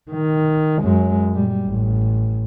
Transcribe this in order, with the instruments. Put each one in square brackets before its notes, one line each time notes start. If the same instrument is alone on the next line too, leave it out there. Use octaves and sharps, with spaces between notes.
[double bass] D#3
F#2 G#3
A#2 G3
A1